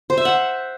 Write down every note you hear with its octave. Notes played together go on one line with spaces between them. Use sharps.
C5
E5
F#5